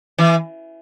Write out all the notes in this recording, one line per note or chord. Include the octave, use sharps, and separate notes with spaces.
E3